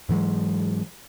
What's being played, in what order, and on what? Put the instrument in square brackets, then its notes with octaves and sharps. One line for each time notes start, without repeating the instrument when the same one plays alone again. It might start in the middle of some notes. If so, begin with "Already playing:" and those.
[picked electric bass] G#2 E3 F#3 G#3